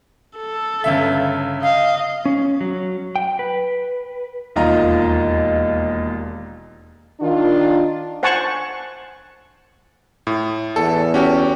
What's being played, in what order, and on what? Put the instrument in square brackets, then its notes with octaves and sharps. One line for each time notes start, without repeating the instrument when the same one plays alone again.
[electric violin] A4
[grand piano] G1 C#3 E5
[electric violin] D#5 [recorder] F5
[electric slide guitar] C#4
F#3
G5
B4
[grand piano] E1 D#2 D#4 F4 D#5 A#5
[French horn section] D#3 D4 F4
[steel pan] C5 F#5 G#5 A5 C#6
[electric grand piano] A2
[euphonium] E2 [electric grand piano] A4
[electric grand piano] C#4 F#4 G4